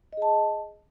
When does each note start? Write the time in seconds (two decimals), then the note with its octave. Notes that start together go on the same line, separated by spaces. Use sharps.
0.13 D#5
0.17 G#4
0.22 A5